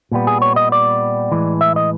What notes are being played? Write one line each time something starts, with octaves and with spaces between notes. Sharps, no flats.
A#2 G3 B3
G#4
C#5
D#5
D5
A2 E3 G#3
E5
D#5